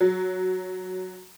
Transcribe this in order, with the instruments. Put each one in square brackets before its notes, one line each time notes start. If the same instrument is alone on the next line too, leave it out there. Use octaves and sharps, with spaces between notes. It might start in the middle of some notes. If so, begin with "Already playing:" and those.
[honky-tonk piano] F#3